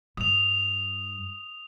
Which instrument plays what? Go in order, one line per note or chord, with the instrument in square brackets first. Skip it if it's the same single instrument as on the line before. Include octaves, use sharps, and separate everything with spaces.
[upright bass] G2 [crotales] D#6 F7